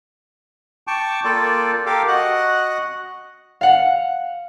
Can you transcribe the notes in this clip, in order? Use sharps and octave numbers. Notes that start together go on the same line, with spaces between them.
G5 A5 C#6 D6
A#3 F4 A4 D5 G5
G4 A4 A#4 F5 G5 D6
F#4 D#5 F#5 F#6
F5 F#5